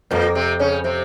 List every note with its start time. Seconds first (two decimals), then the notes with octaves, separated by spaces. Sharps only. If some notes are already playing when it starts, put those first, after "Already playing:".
0.11 F2 A#2 A#3
0.35 C3 C4
0.59 C#3 C#4
0.84 C3 C4